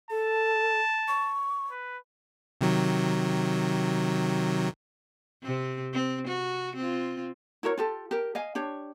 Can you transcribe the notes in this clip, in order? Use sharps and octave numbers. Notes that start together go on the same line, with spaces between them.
A4 A5
C#6
B4
C3 D#3 F#3
C3 C4
C4
F#4
C4 F4
E4 F#4 A#4 C#5
F4 G4 A4
G4 A#4
D#5 F5 G#5
D4 G4 C#5